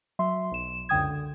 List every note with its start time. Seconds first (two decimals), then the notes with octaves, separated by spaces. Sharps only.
0.19 F#3 E5 C6
0.51 B1 E7
0.89 C#2 F#2 D3 G5 D#6 G#6
1.10 D3